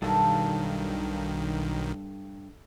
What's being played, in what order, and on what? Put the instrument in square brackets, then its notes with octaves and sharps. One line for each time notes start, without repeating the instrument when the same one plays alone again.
[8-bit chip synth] B1 D#3 [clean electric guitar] G2 [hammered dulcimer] A4